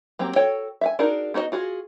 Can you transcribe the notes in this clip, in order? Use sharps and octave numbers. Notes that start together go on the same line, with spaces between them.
F#3 A#3 C4 G4
F#4 A4 C#5 G5
E5 F5 G#5
D4 D#4 F#4 G#4 A#4
B3 D#4 F#4 C#5 D#5
F4 F#4 G#4